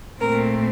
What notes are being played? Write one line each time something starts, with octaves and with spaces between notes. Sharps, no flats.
A#2 A3 C4 A#4